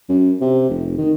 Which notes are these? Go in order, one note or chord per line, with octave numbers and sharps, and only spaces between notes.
F#2
C3
F1
D#3